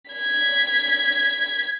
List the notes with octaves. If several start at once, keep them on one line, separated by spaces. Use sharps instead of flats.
G#6 B6